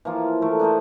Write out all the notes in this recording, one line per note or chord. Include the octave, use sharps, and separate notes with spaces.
E3 F3 A#3 F4
E3 A3 A#4
D4 G#4 A#4 C5